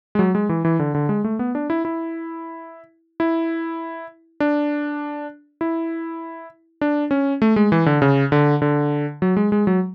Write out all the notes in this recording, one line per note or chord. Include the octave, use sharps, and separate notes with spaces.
G#3
F#3
G#3
E3
E3
D3
D3
G#3
A3
B3
D4
E4
E4
E4
D4
E4
D4
C#4
A3
G#3
E3
D3
C#3
D3
D3
F#3
G#3
G#3
F#3